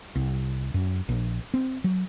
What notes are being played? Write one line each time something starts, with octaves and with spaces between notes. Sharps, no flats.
C2
F#2
A#1
C4
F#3